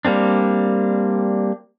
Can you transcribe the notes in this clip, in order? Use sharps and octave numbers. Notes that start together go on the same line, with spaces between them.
G3 A#3 C4 D4